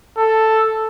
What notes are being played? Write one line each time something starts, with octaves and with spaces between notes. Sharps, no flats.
A4